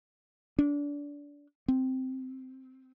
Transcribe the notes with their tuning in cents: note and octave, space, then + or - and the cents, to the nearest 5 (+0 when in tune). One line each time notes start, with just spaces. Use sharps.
D4 -25
C4 -5